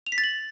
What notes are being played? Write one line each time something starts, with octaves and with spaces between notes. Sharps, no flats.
F7
B6
A6
F#7